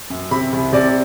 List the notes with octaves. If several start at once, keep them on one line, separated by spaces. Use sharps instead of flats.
F#2
C3 B5
C2
C3 D5